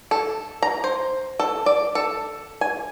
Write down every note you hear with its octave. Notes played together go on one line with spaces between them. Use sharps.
A4
A#5
C5
A4
D5
A4
G#5